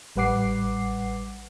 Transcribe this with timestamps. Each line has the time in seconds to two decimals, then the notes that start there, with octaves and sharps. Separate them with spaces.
0.16 A1 G3 B4 F#5 D6 C7